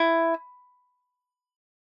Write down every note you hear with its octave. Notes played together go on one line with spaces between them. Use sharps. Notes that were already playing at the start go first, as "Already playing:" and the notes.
Already playing: E4